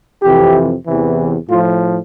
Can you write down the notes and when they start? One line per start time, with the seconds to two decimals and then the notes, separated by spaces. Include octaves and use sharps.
0.23 F2 C3 E3 G4
0.86 E2 C3 E3
1.49 A2 F3 F4